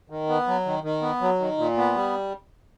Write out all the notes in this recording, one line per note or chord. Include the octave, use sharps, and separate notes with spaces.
D#3
B3
F#3
D#3
D#3
B3
F#3
D#3
A#2
B3
G3